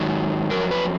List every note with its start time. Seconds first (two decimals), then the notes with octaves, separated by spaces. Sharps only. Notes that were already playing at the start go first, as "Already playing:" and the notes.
Already playing: G#2 D#3 F#3
0.50 F2 D#3 F#3 A#4
0.71 B4